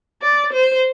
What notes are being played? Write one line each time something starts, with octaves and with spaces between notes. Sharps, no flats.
D5
C5